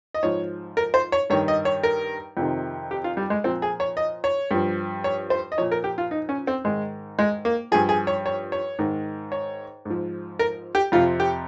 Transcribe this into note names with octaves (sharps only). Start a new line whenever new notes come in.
D#5
G#2 F3 C#5
A#4
C5
C#5
G2 D#3 C#5
D#5
C#5
A#4
F2 C3 D#3
G4
F4
G3
G#3
A#2 F3 C4
G#4
C#5
D#5
C#5
G2 F3
C#5
C5
D#5
A#2 F3 C#5
A#4
G4
F4
D#4
C#4
C4
G#2 D#3 G#3
G#3
A#3
G2 F3 G#4
G#4
C#5
C#5
C#5
G#2 D#3
C#5
G#2 F3
A#4
G4
F2 C3 F3 F4
G4